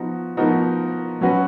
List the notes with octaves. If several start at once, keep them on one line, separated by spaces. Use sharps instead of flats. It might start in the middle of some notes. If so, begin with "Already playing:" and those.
Already playing: F3 B3 D#4 F#4
F3 B3 D#4 F#4 A#4
F#3 C#4 F#4 B4